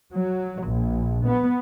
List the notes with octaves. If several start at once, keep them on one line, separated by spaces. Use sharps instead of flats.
F#3
A#1
B3